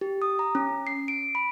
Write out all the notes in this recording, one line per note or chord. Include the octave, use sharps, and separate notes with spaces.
G4
D#6
A#5
C#4
C7
D7
B5